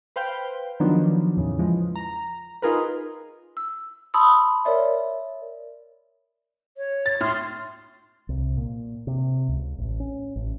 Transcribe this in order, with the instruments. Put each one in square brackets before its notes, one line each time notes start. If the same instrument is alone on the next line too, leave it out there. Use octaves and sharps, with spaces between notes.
[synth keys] B4 C5 F5 G5 G6
D#3 F3 F#3 B3 D4 D#4
E2 A2 C#3
E3 F3 G#3
A#5
D#4 F4 G#4 A#4 B4
[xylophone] E6
A5 B5 C6 D#6 E6
A#4 C#5 D5 E5
[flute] C#5
[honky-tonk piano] A6
[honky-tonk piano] A2 F6 [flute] C6
[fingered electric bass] C2
A#2
C3
C#2
A1
C#4
A1